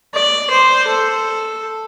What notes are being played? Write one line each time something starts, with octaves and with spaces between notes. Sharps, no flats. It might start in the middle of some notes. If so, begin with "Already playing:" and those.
D5
C5
A4